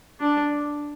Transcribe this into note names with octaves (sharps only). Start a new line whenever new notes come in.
D4